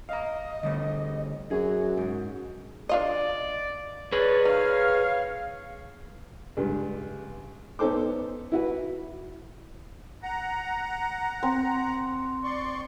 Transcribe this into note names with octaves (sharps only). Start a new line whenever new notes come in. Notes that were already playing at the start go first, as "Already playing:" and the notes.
D#5 F5 A#5
D3 G3 A3
F#2 F#4 G#4
G#2
D4 F4 D5 D#5
G#4 B4 C#5 D5
D#4 C#5 F5 F6
C#2 G2
B3 C#4 D#4 A4 C5 D6
E4 F#4 B4
F#5 A#5
C4
D5 C6 C#6